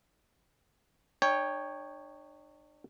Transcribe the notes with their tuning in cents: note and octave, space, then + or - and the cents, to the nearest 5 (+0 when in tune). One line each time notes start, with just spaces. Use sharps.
D4 +45 C#5 +0 G5 +25